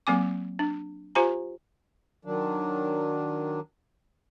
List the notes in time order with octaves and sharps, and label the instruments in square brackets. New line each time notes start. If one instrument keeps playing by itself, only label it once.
[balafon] F#3 A#3 C4 G#5 D6
D4
F4 G4 C5 F5 G#5 A#5
[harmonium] D#3 F#3 D4